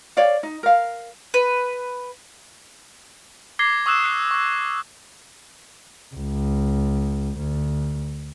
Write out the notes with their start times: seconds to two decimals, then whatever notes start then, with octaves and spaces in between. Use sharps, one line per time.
0.17 C#5 D5 F5
0.43 D#4
0.63 A#4 F5
1.34 B4
3.59 D6 G#6 A#6 C7 G7
3.86 C#6 D#6 E6 F#6 E7
4.04 F#6 C7
4.31 C#6 E6
6.14 C#2
7.38 D2